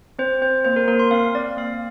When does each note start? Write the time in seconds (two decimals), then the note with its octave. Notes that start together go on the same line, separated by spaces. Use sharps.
0.19 C4 C5
0.41 C4 C5
0.65 A#3 C5
0.76 A#4
0.88 A#3 A#4
0.99 C6
1.11 C4 F5
1.35 C4 D5
1.57 A#3 F5